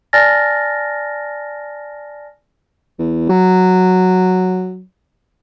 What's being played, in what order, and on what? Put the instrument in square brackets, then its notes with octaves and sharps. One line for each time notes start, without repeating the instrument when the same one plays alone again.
[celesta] D5 G#5 A5 F6 A6 A#6
[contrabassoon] E2
F#3